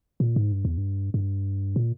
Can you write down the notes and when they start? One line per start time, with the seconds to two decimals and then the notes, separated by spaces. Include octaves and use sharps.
0.20 A#2
0.36 G#2
0.52 G2
0.65 E2
0.77 G2
1.14 G2
1.76 A#2